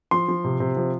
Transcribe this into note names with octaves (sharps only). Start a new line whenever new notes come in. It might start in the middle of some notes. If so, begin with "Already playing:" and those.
F3 C6
F3
C3
C3
F3